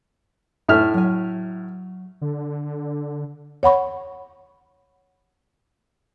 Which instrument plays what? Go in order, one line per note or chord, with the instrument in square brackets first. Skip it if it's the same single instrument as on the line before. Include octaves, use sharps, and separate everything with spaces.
[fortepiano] A2 E5 F6
[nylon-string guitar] F#3 G#5
[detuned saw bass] D3
[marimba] C#5 F#5 B5 C#6